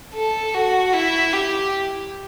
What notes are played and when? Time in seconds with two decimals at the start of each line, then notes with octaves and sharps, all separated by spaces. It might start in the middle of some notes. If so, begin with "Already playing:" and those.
0.14 A4
0.54 F#4
0.94 E4
1.33 G4